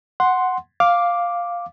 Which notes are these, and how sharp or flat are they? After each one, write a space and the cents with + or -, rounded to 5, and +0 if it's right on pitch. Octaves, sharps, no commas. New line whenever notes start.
F#5 +0 C6 +0
F5 +0 D6 +0